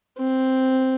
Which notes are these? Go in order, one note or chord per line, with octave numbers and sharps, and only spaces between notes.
C4